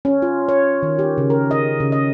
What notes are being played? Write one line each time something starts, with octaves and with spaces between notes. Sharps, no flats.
C#4
F4
C#5
D#3
G4
C#3
A#4
D#5
C#3
D#5